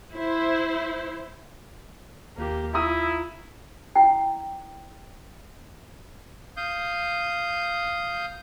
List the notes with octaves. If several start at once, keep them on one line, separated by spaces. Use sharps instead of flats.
E4 C5
D#2 A#3 G4
E4 F4 A#5 D#6 E6
E4 G5
F5 D#6 G6